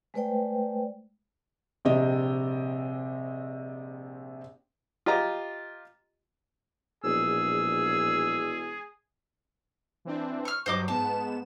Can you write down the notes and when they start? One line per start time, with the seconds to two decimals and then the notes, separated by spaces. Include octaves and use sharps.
0.14 G#3 A3 B4 C5 D5 G5
1.85 A#1 C3 C4 G4 D#5
5.06 F4 G4 D#5 A#5
7.04 E1 A#1 G#4 E6
10.05 E3 C4 D4
10.45 C#6 F6
10.66 G2 F#3 C5 D#5 D6
10.88 G#2 B3 A5 E7